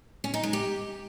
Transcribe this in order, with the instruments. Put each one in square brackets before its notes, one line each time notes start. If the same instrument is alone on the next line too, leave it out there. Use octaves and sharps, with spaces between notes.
[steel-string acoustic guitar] C#4
D#4
G#3
G4